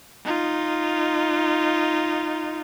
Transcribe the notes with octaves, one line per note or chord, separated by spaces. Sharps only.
D#4 F4